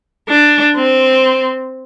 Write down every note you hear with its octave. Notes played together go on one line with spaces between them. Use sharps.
D4
C4